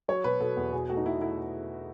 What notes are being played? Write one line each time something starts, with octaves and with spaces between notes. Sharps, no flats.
F#3 C#5
B2 B4
B2 A4
E2
B2 G#4
A3 F#4
D#4
B2 E4
A3 E4